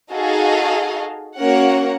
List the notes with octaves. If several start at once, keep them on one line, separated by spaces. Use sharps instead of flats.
D#4 F#4 G#4 A4 D#5 F5
A#3 C#4 F#4 A#4 F#5